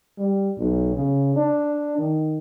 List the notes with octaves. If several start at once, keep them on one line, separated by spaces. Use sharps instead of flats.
G3
B1
C#3
D4
D#3